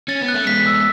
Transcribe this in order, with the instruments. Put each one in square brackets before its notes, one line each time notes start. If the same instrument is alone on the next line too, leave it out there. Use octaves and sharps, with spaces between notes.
[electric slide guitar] C#4 [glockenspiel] A6
[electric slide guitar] B3
[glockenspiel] F#6
[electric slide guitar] A3
[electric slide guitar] G#3 B3 [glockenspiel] B6
[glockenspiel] E6